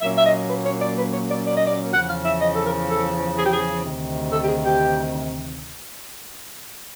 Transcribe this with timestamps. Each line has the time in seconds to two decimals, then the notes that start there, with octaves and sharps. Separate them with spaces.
0.01 A#2 F#3 A#3 C#4 E5
0.16 E5
0.26 D#5
0.49 B4
0.66 C#5
0.82 D5
0.97 B4
1.13 C#5
1.29 D5
1.45 D5
1.55 D#5
1.66 D5
1.93 E2 C#3 F3 F#5
2.09 F5
2.25 E5
2.41 D#5
2.54 A4
2.65 A#4
2.89 A4
3.37 G#4
3.45 G4
3.53 G#4
3.84 D2 C3 D#3
4.32 A4
4.44 G4
4.49 G#4
4.65 G4